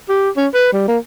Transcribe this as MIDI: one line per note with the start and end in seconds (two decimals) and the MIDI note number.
0.09 0.29 67
0.37 0.47 61
0.54 0.69 71
0.73 0.83 55
0.88 0.98 58